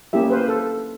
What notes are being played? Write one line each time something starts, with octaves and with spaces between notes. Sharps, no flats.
A#3 C#4 E4 G4 E5
B4 C5 F5
A4